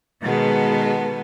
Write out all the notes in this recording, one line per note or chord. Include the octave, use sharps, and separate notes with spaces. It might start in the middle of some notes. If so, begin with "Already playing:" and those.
B2 D#3 G#3 B3 A4